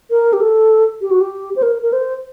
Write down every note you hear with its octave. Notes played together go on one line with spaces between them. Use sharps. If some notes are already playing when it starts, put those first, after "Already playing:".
A#4
G4
A4
G4
F#4
G4
C5
A#4
A#4
C5